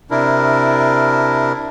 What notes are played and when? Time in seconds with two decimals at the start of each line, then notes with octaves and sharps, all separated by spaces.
0.11 C3 D4 E4 A#4